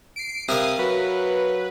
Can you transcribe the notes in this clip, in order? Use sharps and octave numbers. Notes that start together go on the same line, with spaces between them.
C7 D7
C3 E4 A#4 F5 D#6
F#3 F#4 B4